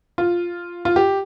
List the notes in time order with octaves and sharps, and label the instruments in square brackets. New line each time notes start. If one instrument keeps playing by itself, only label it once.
[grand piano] F4
F4
G4